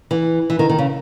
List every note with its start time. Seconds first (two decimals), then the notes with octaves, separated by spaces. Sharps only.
0.11 E3
0.50 E3
0.59 D#3
0.69 D#3
0.78 C#3